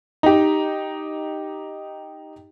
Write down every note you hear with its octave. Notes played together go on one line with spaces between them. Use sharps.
D#4 G4